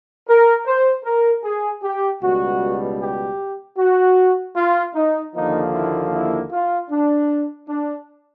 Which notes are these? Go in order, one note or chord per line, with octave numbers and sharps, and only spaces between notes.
A#4
C5
A#4
G#4
G4
C#2 B2 G3 F#4
G4
F#4
F4
D#4
D#2 D3 F3 A#3 D#4
E4
E4
F4
D4
D4